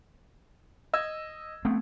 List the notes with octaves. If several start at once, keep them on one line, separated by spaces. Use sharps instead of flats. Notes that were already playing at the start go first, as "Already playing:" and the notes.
D#5 E6 G#6
A3 B3 C4